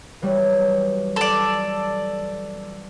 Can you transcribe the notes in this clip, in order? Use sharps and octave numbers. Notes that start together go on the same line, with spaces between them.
E3 F#3 G3
A4 D5